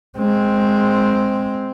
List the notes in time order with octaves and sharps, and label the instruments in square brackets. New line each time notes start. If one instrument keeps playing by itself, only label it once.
[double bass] G#3 C4